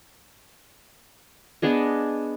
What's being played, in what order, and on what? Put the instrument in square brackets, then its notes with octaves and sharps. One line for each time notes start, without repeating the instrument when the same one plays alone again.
[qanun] B3 D4 G#4 D#5